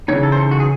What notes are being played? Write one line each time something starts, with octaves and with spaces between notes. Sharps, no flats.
C#3 E3 C4 D#4 C#5
A4
C5
A4
F#4
G#4